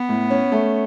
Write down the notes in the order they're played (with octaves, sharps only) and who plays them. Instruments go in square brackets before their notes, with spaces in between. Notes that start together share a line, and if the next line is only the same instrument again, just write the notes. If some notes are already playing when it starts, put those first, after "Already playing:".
Already playing: [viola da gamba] B3
[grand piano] A2
C#4
A3